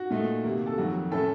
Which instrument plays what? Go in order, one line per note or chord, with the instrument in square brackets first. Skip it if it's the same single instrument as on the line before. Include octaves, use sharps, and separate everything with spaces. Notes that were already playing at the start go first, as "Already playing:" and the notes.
Already playing: [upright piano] F#4
A#2 A3 D#4
C3 D#3 A#3
A4
F2 D#3 F#3 F#4
A2 A3 C#4 A4